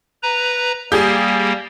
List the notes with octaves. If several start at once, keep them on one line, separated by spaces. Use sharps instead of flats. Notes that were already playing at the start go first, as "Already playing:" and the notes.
B4 A#5
G3 A#3 G4 G#4